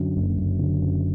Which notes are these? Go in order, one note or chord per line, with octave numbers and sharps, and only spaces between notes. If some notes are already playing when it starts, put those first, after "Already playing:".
Already playing: F#2 D3
F#1
F#1
D3
F#2